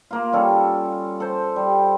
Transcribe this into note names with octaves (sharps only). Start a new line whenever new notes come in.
A#3 F4
G3 C#4 A4
A4 C5
G3